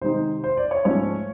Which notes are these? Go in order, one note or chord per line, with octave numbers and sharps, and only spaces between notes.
C3 D#3 G#3 C4 D#4 C5
C5
D5
C#5
G#2 F3 A3 C#4 C#5